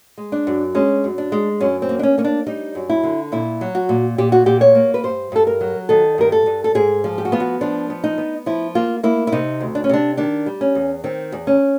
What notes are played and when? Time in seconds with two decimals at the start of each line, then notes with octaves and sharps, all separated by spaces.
0.18 G#3
0.32 D4
0.47 F#2
0.75 G#3 C#4
1.04 F#2
1.18 D4
1.32 G#3
1.60 F#2 C#4
1.82 C4
1.89 A#3
1.99 D4
2.03 C#4
2.18 A#3 C#4
2.24 D4
2.47 G3 D#4
2.75 F#2
2.89 E4
3.03 D3
3.32 A#2 E4
3.61 F#3
3.75 F#4
3.89 A#2
4.18 A#2 G4
4.32 F#4
4.46 A#2 G4
4.61 C#5
4.75 A#3
4.94 B4
5.03 G2 C5
5.32 G2 A4
5.47 A#4
5.61 F#3
5.89 D#3 A4
6.18 G2 A#4
6.32 A4
6.46 G2
6.64 A4
6.75 G#2 G#4
7.04 F3
7.18 G4
7.25 F#4
7.32 B3 F4
7.40 F#4
7.61 F3 D4
7.90 B3
8.04 D#4
8.18 B3
8.46 F3 E4
8.75 A#3 F4
9.03 A#3 E4
9.27 E4
9.32 C3 D#4
9.61 D2
9.75 D4
9.84 C#4
9.89 C3 D4
10.17 D#3 D4
10.46 G3
10.61 C#4
10.75 E2
11.04 D#3 C4
11.32 E2
11.47 C#4